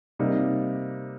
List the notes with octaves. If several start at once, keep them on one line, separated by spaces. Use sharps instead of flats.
C3 G3 A#3 D#4